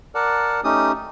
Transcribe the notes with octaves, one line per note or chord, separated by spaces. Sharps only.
A#4 D5 F#5 A5
A3 C#4 D#4 G4 D#6